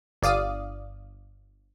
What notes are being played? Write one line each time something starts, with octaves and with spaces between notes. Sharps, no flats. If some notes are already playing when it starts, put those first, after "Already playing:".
G1 D5 F5 D#6